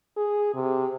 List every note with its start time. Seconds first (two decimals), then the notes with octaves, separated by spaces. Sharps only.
0.17 G#4
0.54 C3